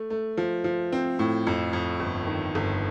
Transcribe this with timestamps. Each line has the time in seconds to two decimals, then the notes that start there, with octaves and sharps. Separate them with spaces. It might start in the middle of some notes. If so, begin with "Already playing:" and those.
Already playing: A3
0.10 A3
0.37 F3
0.64 F3
0.92 C4
1.19 A2
1.47 F2
1.73 F2
2.00 G1
2.27 D#3
2.55 G1